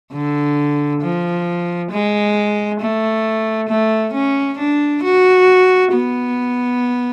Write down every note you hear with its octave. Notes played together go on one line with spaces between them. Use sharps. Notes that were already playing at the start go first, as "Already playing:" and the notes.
D3
F3
G#3
A3
A3
C#4
D4
F#4
B3